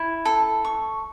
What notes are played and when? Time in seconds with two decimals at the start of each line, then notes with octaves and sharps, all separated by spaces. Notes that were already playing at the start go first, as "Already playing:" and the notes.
Already playing: E4
0.25 A4
0.65 C#6